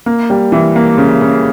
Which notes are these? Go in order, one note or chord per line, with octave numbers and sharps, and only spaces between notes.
A#3
G3
E3
A#3
C#3
C#3